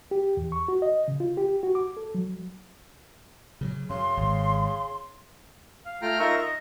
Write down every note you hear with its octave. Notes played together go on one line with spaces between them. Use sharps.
G4
E2
C#6
F#4
D#5
C#3
F4
G4
F#4
D6
A4
F#3
C#3 F3 F#3
F#2 C#3 C6
G#1
F5
A3 F4 G5 A#5 F6
D#4 F4 A#4 E5 A#5 C#6
D#5